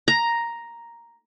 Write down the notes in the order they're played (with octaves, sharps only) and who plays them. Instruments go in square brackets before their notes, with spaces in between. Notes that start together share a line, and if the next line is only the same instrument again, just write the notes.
[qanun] A#5